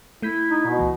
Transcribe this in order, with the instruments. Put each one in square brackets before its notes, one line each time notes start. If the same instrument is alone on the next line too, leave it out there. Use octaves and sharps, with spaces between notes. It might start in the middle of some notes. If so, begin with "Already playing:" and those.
[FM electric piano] A3 G6 B6 [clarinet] E4
[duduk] D#4
B2
[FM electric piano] C#2 E3